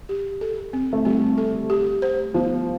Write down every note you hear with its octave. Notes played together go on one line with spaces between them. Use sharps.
G4
A4
C4
A3
G3 C4
A4
G4
C5
F3 B3